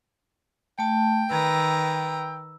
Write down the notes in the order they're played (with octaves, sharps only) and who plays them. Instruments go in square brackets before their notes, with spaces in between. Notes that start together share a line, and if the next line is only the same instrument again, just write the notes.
[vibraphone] A3 A5 [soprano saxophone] G5
[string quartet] D#3 B4 A#5 [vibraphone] E6